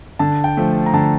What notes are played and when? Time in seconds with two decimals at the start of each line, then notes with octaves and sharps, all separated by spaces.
0.19 D3 A5
0.44 G5
0.57 F3 A3
0.86 A#5
0.94 D3 A5